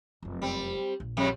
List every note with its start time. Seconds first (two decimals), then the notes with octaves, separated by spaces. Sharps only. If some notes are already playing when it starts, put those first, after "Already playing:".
0.23 F1 F#2
0.42 G3 C4
1.00 A#1
1.17 F2 G3 G#3